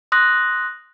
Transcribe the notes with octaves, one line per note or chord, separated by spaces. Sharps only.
C6 D#6 F#6 A#6